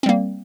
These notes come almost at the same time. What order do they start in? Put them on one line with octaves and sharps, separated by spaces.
C4 G3 A#3